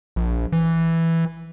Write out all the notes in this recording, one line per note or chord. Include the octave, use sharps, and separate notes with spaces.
A#1
E3